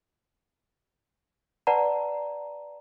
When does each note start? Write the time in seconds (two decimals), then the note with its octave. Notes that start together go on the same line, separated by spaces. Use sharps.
1.67 B4 D5 F#5 A5 A#5